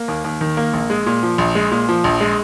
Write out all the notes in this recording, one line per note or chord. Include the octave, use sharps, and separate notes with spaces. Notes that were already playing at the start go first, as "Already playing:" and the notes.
Already playing: A#3
D#2
D#2
D#3
A#3
A#1
G#3
A#2
F3
A#1
G#3
A#2
F3
A#1
G#3